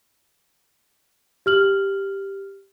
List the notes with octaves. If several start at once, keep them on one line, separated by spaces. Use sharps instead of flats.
G4 F6 F#7